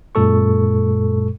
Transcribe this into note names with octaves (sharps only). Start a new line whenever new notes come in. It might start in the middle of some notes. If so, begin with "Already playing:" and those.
F#2 A#2 G#3 A4 C#6